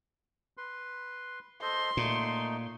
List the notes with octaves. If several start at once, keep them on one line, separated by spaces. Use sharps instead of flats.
B4 C6
A4 C5 D#5 C6
A#2 A3 D#4